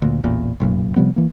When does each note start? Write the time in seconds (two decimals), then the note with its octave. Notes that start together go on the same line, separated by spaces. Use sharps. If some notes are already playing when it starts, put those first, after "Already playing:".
0.02 D2 A#2
0.24 A1 E2 A#2
0.60 F1 B1 F#2 A#2
0.96 C3 F3 G3 B3
1.16 E3 A#3